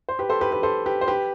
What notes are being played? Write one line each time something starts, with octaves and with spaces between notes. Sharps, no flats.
C5
G4 B4
A4 C5
G4 B4
G4 B4
A4 C5
G4 B4
C5
G4 B4